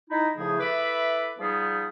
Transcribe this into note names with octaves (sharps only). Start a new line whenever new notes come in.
D#4 E4
A2 C#3 F3 A3 E4 G#4
E4 A4 B4 E5 B5 D6
F3 G3 B3 D#4 G#4